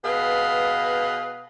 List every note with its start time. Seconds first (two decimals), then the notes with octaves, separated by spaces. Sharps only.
0.05 B2 G#4 B4 F5